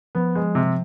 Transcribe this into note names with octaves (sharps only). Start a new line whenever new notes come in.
F3 B3
G#3
C3